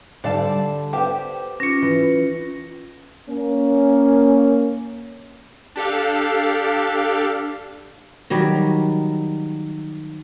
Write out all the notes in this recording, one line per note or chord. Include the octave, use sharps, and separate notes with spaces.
D3 G3 A4 D5 F5 A5
B3 G4 C5 G5 D6
C#4 F4 A#6 C#7
E3
A#3 C#4
D4 G4 A4 F5
D#3 F#3 G3